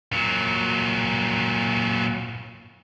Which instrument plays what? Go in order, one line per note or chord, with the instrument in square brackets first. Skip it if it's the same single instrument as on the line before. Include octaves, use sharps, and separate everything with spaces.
[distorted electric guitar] A#2 F#3